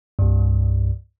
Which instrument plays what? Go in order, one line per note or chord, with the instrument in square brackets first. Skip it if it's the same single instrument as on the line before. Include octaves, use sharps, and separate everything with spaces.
[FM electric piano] C2 G2